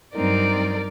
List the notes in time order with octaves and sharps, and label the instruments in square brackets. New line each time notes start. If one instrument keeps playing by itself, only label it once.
[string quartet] G2 F#3 C4 D#4 A#4 D5